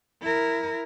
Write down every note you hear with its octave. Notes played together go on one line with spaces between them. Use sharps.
E4 A#4